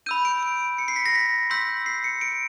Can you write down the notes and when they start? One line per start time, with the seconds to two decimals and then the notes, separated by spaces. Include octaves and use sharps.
0.06 B5 E6 G6 D#7
0.25 D7
0.43 D7
0.78 C#7
0.88 C7
0.96 B6
1.06 A#6
1.15 B6
1.50 C6 E6 G6 B6
1.86 C7
2.04 C#7
2.21 D7